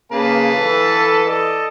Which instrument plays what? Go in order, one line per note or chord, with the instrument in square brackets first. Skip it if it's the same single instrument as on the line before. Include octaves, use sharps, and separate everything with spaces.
[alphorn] C#3 [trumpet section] A#3 [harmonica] B4 F5 A5
[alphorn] E3 [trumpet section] A4
[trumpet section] A4 D5 D#5